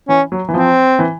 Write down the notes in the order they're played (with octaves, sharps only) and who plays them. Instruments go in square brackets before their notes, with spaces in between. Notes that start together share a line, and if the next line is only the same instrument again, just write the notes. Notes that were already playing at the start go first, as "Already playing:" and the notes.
[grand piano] E3 [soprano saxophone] C#4
[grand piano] F#3
E3
[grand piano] F3 [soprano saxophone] C4
[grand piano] E3